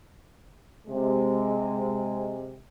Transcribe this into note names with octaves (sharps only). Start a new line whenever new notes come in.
C3 G#3